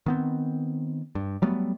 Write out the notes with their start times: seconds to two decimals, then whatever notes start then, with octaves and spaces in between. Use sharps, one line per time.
0.06 D#3 B3 C4
1.15 G2
1.42 F#3 G3 A3 B3